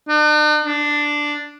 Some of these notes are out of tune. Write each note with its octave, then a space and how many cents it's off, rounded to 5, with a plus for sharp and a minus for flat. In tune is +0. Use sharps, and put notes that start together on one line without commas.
D4 +45
D4 +0